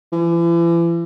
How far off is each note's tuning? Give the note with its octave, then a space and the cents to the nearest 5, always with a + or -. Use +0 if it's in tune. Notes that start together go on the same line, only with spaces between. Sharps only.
E3 +40